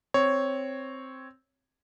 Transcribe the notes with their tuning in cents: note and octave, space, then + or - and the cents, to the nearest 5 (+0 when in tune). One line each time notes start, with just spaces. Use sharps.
C4 +0 C#5 +0